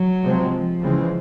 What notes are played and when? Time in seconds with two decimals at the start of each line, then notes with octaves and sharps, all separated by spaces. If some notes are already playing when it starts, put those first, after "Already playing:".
Already playing: F#3
0.23 C3 F3 G#3 C4
0.52 F3
0.80 C#3 E3 G#3 C4